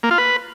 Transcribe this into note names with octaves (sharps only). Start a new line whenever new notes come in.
A#3
F4
B4